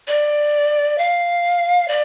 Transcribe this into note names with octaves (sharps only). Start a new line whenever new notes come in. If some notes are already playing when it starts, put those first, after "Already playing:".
D5
F5
D5